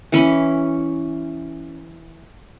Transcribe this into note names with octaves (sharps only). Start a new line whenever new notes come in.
E3 C#4 B5